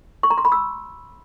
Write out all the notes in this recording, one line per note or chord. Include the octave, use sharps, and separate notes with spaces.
C#6
A#5
C6
B5
E6